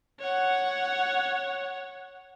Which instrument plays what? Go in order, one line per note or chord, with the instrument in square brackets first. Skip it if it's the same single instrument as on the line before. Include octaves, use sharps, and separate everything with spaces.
[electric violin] C#5 F#5